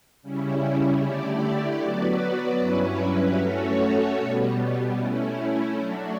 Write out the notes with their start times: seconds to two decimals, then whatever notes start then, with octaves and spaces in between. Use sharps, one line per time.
0.22 C#3 G3 C#4 E4
1.02 D3 A3 E4 G4 D5
1.80 F#3 B3 F#4 B4 D5
2.60 G2 F#3 C#4 E4 B4
3.39 A3 C#4 F#4 A4 C#5
4.18 B2 G3 B3
4.97 A3 C#4 E4
5.76 F#3 A3 D4 F#4